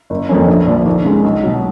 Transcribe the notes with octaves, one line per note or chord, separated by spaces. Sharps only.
F#1
F2 F3 A#3 C#4
A#1
A#2 F3
D#2
C#3 G#3 D#4
B1
B2 F#3